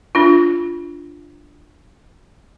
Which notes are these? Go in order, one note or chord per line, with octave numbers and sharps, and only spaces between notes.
D4 F4